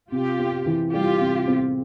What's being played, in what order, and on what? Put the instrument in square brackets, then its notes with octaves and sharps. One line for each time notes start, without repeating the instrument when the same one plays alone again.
[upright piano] C3 [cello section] F4 G4
[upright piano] C4
E3
[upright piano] G3 [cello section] F4 G4
[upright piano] C3
C4